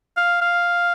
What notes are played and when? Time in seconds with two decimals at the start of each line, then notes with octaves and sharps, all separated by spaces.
0.17 F5
0.42 F5